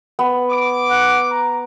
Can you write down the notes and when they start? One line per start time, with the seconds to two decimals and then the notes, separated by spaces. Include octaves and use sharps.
0.19 B3
0.51 D6
0.90 F#5
1.31 A#5